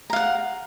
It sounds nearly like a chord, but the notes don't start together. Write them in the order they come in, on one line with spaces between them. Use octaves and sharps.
A#5 F5 F#5